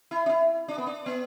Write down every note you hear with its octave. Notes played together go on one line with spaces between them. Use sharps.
E4
D4
E4
D4
B3
D4
B3